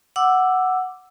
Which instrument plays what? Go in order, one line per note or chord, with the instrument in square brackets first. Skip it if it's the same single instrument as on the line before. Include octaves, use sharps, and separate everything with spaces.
[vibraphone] F#5 D6 E6